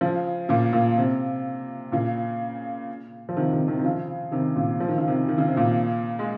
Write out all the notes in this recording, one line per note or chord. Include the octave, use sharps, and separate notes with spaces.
C#3 F3
A#2 C#3
A#2
C3
A#2 C#3
F3
C3 D#3
C3 D#3
C3 D#3
D#3
C#3 F3
C3 D#3
A#2 C#3
F3
D#3
C#3
C3 D#3
D#3
C#3
C3
A#2 C#3
G#3